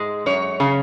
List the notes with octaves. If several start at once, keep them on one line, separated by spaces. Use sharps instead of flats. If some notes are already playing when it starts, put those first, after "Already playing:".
Already playing: G#2 G#3
F#2 C#5
C#3